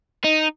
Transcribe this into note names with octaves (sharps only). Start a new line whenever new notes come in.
D#4